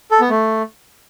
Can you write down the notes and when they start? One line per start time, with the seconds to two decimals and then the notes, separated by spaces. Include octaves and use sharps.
0.11 A4
0.21 B3
0.30 A3